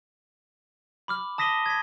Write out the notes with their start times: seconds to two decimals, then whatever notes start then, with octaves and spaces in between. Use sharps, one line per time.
1.08 B5 D6 F6
1.38 A5 D#6 A#6 B6 D#7 G7
1.66 G#6 B6